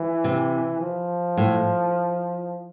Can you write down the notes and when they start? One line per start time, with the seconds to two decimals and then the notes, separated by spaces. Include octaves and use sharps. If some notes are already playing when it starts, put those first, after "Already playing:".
Already playing: E3
0.24 C3
0.81 F3
1.37 A2